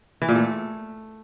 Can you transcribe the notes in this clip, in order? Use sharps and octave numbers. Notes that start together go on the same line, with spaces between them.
E3
A#2
A3